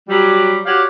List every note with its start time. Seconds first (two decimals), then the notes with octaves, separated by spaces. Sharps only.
0.09 F#3 G3
0.66 F#4 G4 C#5 D5 F5 F#5